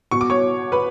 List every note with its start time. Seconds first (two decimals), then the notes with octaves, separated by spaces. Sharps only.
0.11 B2 C#6
0.21 D6
0.30 C#5 C#6
0.72 B4 B5